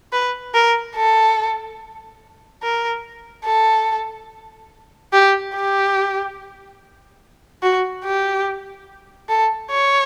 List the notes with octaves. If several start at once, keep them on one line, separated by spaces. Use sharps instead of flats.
B4
A#4
A4
A#4
A4
G4
G4
F#4
G4
A4
C#5